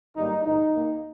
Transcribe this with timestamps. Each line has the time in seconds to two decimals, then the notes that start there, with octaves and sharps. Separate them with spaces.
0.16 G#1 G2 G3 A#3 D#4
0.45 A#1 G#2 D#3 D#4
0.74 D#2 D#3 A#3